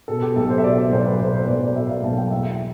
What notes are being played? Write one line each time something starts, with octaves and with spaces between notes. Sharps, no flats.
B2 A4
G4
B1 A4
C5
E5
B2 D5
D5
B1 C5
B4
B2 C5
C5
B1 D5
D5
B2 E5
F5
B1 A5
G5
E2 E5